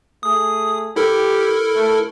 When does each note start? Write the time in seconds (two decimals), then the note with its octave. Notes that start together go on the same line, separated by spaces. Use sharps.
0.23 A3 G#4 D#6
0.96 E4 G4 A4 A#4
1.74 A3